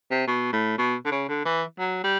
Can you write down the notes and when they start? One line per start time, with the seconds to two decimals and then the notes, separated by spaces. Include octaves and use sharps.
0.11 C3
0.27 B2
0.53 A2
0.78 B2
1.05 D3
1.11 C#3
1.28 D3
1.45 E3
1.79 F#3
2.04 G3